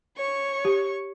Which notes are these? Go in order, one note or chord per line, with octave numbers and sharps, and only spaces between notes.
C#5 C#6
G4